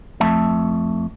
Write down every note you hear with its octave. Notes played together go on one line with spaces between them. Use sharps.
F2 A3 E5 A5